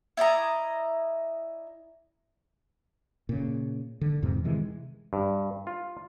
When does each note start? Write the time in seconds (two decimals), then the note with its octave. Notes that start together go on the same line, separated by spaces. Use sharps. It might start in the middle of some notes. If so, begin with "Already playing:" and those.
0.17 E4 D5 D#5 A#5
3.29 A#2 C#3
4.01 D3
4.22 E2 G#2 C3
4.44 C3 D#3 E3 G#3
5.13 G2
5.67 F4